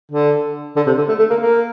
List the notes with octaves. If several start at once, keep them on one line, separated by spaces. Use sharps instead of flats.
D3
D3
C3
D3
A3
A3
A#3
A#3